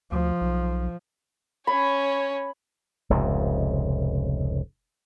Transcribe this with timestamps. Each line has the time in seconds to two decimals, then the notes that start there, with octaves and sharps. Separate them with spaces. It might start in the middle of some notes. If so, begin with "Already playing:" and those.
0.12 D2 F3
0.41 B1
1.67 C#4 C#5 B5
3.10 F1 C#2 G#2 C3